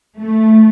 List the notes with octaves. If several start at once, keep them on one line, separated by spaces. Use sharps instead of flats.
A3